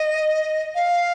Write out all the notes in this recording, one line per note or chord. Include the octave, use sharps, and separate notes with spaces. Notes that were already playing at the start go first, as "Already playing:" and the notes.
Already playing: D#5
F5